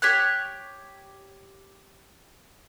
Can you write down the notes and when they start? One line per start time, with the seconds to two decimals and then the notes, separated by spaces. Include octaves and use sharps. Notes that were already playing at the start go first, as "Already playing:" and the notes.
0.02 G4 C#5 F#6